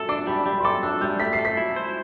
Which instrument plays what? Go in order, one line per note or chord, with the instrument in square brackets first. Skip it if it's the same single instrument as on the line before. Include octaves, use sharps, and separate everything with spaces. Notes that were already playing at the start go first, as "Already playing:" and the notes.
Already playing: [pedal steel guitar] A4 [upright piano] E6
[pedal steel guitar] D4 [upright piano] D6
[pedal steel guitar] G3 [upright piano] B5
[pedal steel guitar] G3
[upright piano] C6
[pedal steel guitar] A4 [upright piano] D6
[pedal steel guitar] D4 [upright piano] E6
[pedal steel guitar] G3 [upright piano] G6
[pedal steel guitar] A3 [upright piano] B6
[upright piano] C7
[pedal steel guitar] A4
[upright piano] B6
[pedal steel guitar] E4
C5